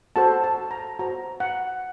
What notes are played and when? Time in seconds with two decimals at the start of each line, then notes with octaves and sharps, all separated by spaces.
0.16 F#4 A4 C5 A5
0.43 A5
0.71 A#5
0.99 F#4 C5 A#5
1.40 F#5